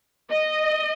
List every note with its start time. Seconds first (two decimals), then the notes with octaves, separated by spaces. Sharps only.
0.29 D#5